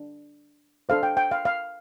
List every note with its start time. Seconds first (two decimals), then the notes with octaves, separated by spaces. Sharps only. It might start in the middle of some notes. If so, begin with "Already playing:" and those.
Already playing: D4
0.89 D4 A4 C5 F5
1.03 G5
1.17 G5
1.31 F5
1.45 F5